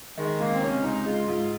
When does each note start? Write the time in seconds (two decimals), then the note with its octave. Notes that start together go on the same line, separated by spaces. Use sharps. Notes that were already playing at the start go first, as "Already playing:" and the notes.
0.18 D#3 G#3
0.39 C#2 A#3
0.54 C4
0.61 C3 C#4
0.83 C#2 D#4
1.06 G#3 F4
1.28 G#2 F4